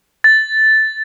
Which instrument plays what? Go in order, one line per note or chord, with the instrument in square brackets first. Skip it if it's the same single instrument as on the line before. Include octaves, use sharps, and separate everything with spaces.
[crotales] A6